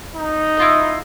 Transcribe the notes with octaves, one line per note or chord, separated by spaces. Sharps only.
D#4
E4 F4 D#5